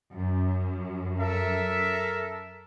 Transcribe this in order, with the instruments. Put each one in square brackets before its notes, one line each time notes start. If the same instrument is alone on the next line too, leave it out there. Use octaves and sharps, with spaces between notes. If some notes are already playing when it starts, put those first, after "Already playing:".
[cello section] F#2
[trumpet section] A4 A#4 E5